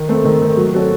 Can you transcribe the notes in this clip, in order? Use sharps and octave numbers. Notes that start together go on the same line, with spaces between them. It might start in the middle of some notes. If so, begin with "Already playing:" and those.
Already playing: D#3
A3 C4
D#3
A3 C4
F#3
C4 F#4 A4 C#5